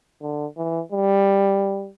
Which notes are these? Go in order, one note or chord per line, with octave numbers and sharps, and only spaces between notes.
D3
E3
G3